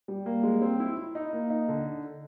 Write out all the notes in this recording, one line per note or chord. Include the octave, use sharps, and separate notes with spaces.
G3
A#3
G#3
C4
E4
E4
D#4
A#3
D#4
D3